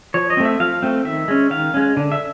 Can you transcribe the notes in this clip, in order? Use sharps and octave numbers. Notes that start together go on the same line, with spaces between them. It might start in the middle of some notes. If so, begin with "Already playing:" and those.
F3 C#5
D#5
A3 C4
E5
F3 F5
A3 C4
D#3 E5
G#3 C#4
D#3 F5
G#3 C#4
D3
E5